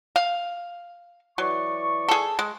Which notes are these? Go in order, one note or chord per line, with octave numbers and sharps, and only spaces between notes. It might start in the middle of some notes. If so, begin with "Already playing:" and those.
F5
E3 F#3 D5 C#6
G#4 A4
G#3